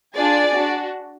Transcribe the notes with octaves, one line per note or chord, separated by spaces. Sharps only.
D4 F4 G#4 D5
D4 F#4